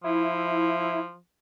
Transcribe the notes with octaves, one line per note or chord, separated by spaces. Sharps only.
F3 E4